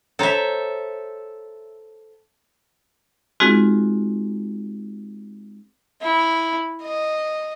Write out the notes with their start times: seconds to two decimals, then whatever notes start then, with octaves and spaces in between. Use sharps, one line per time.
0.19 A4 C5 C#5 E5 A#5
3.40 G#3 C4 D#4 F4 F#4 G#4
6.02 E4
6.82 D#5